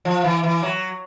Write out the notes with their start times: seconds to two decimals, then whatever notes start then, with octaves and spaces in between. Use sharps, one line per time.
0.05 F3
0.24 E3
0.44 E3
0.63 F#3